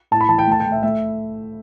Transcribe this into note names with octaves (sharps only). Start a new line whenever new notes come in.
A2 A5
B5
E3 A5
G5
A3 A5
G5
A3
E5
A3 E5